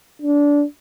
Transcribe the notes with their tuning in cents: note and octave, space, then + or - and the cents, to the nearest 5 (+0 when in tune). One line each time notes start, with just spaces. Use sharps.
D4 -20